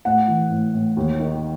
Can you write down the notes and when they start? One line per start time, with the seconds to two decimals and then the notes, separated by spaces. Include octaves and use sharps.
0.05 A2 F#5
0.28 E3
0.50 A2
0.74 A2
0.97 D#2
1.19 D#3